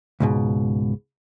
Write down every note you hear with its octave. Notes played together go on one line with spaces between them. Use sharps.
C#2 G#2 B2